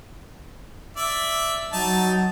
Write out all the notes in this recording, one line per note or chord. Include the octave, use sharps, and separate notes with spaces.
D5 E5
F#3 D#4 A5